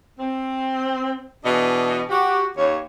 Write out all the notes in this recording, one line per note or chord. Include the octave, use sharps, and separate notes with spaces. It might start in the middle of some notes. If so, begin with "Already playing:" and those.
C4
B2 E3 D4 G#4 D#5
F#4 G4
D#2 A#3 C#5